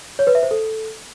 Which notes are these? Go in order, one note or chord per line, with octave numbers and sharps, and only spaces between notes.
C#5
B4
E5
C5
A4